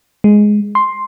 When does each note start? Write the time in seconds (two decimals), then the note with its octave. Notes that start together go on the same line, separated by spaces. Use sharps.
0.24 G#3
0.75 C6